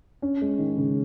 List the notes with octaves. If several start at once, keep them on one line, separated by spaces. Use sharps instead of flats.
C#4
G#3
D#3
C#3